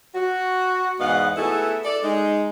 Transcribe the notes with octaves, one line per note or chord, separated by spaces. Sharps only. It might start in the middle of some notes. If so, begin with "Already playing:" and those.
F#4
E2 G#2 B3 D#5 F5 F#5
A3 B3 E4 F#4 G#4 A4
A4 D5
G#3 D#4